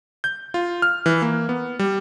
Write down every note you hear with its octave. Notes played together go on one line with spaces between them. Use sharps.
G6
F4
F6
E3
A#3
B3
G3